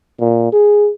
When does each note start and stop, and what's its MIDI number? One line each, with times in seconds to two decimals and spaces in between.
0.20 0.48 46
0.53 0.90 68